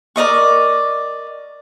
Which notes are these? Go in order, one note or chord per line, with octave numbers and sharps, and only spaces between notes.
A#4 D5 D#5 C#6